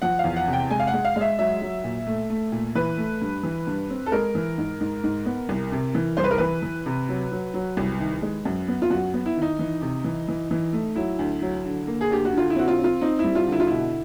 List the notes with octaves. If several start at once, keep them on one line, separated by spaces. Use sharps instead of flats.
F3 F#5
F5
E2
F#5
C3
G5
G#3 G#5
F5
F#5
G#3
F5
G#3
E5
F#3 E5
F#3
A#2
A3
A3
A#2
E3 B4
A3
G2
E3
G2
C4
A4
G#3 A#4
E3
G#2
G#2
G#2
B3
C2
C3
E3
C2 C5
B4
A#4
E3 B4
E3
C3
F#3
F#3
F#3
C2
D#3
G#3
F#2
B3
F4
F#2 F#4
B3
E4
D#3 D#4
E3
C3
E3
E3
E3
A3
F#3 E4
D2
F#3
D3
A#3
G#4
D2 G4
F#4
D3
F4
E4
C4 F#4
F4
C4
F4
C4 D#4
E4
G3
F4
D3 E4
F4
B2 E4